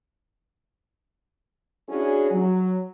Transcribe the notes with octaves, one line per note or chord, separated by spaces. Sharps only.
C#4 D4 E4 F#4 G#4
F#3